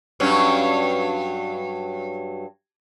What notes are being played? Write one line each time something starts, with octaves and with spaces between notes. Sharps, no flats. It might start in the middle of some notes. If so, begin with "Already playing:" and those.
G2 F#3 C#4